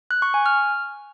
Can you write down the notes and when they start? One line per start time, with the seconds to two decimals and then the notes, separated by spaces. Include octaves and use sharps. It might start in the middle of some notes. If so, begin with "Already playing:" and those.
0.11 F#6
0.22 C#6
0.34 G#5
0.46 F6